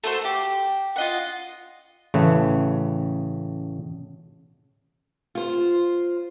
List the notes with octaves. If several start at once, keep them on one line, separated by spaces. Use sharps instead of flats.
A3 F#4 C5
G4
F4 D#5 F#5
A1 C#3 A3 B4
F4 C5